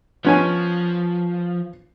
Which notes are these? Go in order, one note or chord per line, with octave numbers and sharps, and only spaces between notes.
F3 B3 C#4 G#5